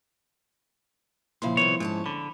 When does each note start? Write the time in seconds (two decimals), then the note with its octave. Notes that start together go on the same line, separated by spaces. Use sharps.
1.42 A#2 C#3 F3 E4 F5 C6
1.57 C2 F2 D#3 B3 C#5
1.80 G#2 C#4 C#5 A5
2.06 D3 B5